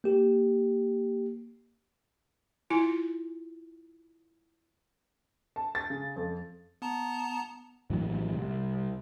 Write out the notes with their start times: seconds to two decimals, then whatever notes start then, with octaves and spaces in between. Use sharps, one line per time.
0.04 A#3 G4
2.70 E4 F4 G#5
5.56 A5
5.75 A6
5.90 C#3
6.16 F2
6.82 B3 A5 A#5
7.90 A#1 A2 E3 F#3
8.33 C2